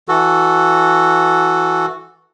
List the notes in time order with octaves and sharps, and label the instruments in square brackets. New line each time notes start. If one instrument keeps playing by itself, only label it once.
[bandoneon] E3 F#4 A4